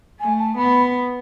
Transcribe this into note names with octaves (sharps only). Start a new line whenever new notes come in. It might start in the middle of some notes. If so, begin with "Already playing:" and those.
A3 G#5
A5
B3 B5